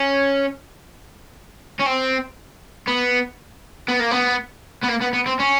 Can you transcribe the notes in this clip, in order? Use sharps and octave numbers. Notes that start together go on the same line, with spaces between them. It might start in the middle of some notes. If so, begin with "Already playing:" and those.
Already playing: C#4
C#4
C4
B3
B3
A#3
B3
B3
A#3
B3
B3
C4
C#4